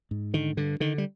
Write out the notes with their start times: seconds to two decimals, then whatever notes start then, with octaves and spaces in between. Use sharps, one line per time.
0.11 G#2
0.34 D3 D#3
0.57 G2 D3
0.80 D3 D#3
0.98 G3